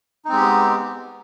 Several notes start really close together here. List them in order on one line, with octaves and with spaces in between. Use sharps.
D#4 C4 G#3 G4 B3